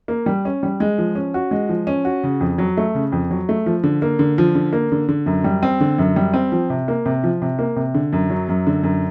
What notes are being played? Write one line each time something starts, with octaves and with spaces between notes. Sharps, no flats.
A#3
G3
C#4
G3
G#3
F3
C#4
F#4
G#3
F3
C#4
F#4
C#3
F2
F#3
A3
C#3
F2
F#3
A3
F3
D3
A#3
D3
F3
D3
A#3
D3
D3
F#2
G3
C4
D3
F#2
G3
C4
F3
C3
A#3
C3
F3
C3
A#3
C3
D3
F#2
F#3
F#2
D3
F#2